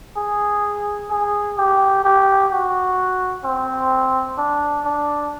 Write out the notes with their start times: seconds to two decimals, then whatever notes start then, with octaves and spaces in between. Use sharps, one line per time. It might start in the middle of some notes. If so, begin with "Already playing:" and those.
0.17 G#4
1.10 G#4
1.58 G4
2.04 G4
2.52 F#4
3.44 C4
4.38 D4
4.85 D4